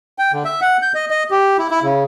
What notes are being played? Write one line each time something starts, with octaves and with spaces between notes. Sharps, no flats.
G5
D3
E5
F#5
G6
D#5
D#5
G4
E4
E4
C#3